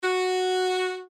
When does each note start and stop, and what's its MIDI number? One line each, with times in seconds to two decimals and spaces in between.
0.03 1.02 66